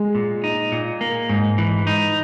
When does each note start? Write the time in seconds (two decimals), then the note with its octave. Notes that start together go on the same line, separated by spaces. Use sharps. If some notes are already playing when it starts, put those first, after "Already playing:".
Already playing: G#3
0.15 A#2
0.44 D#4
0.72 A#2
1.01 A#3
1.29 G#2
1.58 E3
1.87 D#4